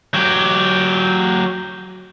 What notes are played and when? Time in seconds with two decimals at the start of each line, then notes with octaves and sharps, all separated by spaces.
0.14 F#3 G4